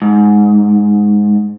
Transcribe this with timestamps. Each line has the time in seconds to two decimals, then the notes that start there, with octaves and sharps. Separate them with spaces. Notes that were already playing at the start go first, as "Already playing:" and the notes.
0.02 G#2